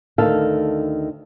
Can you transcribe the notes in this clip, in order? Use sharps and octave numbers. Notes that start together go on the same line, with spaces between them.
D2 D#3 A4 F5